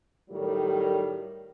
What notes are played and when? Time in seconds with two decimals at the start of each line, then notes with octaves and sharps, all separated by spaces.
0.30 A2 D#3 F#3 G3